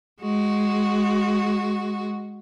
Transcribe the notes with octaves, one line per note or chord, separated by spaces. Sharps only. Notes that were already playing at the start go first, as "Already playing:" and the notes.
G#3 F#4